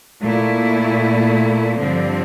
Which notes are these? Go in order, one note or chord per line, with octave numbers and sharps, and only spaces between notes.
A#2 A3 E4
G2 D3 F3 C4